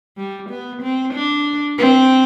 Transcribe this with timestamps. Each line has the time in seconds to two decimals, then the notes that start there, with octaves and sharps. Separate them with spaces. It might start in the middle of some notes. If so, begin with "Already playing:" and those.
0.17 G3
0.50 B3
0.82 C4
1.14 D4
1.78 C4